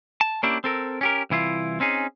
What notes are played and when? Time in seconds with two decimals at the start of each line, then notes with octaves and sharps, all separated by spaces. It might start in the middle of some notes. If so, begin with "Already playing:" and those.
0.21 A5
0.43 A#3 C#4 D4 E4 G4
0.64 C4 A4 A#4
1.01 C#4 G4 A#4
1.30 C2 E3 E4 F4
1.80 C4 C#4 D#4 G#4